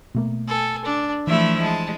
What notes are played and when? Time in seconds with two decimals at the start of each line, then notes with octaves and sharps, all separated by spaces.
0.14 B2 A3 A#3
0.48 A4 G#5
0.85 D4
1.27 E3 F3 A3 E4 E5
1.62 G#3 A5